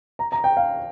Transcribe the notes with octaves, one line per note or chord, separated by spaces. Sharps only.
A#5
A#5
G5
F5